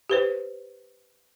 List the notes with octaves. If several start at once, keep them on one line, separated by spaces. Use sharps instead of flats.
G4 B4 C5